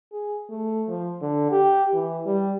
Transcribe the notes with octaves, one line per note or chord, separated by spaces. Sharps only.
G#4
A3
F3
D3
G4
E3
G3